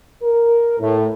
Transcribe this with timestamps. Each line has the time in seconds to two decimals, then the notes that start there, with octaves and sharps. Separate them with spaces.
0.23 A#4
0.80 A2